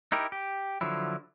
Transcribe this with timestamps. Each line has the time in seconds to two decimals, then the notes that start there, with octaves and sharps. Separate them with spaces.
0.12 D#4 E4 G4 A#4
0.32 G4
0.81 D3 F3 F#3 E4